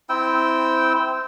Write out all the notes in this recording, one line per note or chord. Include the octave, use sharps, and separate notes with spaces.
C4 E4 G5 E6